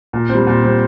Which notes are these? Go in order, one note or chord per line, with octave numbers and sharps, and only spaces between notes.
A#2
G3 C4
A#2
G3 C4